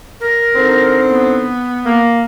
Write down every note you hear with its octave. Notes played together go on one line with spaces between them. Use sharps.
A#4
D3 C4 D#4
B3
A#3